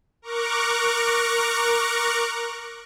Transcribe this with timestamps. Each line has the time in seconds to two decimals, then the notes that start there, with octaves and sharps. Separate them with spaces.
0.22 A#4 A#5 C#6 D6 F#6